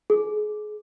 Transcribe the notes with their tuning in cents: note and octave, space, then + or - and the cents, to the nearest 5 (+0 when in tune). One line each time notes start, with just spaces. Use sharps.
G#4 +30